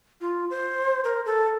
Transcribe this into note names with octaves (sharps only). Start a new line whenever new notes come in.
F4
C5
A#4
A4